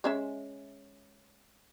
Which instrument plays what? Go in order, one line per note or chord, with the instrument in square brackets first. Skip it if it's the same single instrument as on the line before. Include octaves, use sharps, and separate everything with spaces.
[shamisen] G#3 C#4 E5